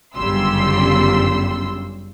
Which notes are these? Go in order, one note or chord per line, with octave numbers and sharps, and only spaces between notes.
G1 F#2 C#3 G3 C6 E6